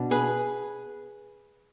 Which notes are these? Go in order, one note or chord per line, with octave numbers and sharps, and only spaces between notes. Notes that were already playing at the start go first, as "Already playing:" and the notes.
Already playing: B2 D4
G#4 B4